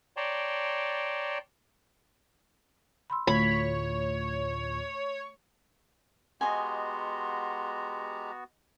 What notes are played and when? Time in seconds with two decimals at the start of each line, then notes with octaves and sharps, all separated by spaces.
0.17 C#5 D5 G5 A5 A#5 C6
3.10 B5 C6 E6
3.27 D2 A2 A3 F4 C#5 B5 G#6
6.41 G#3 B3 F#4 G4 D#5 G#5 A#5 C6